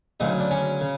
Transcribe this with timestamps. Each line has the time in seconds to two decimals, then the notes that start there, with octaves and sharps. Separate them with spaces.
0.20 D2 C#3 F#3 D#4
0.40 D4
0.51 C#4
0.81 C#3